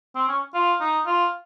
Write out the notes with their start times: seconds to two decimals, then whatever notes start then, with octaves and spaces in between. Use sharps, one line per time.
0.15 C4
0.28 C#4
0.54 F4
0.80 D#4
1.06 F4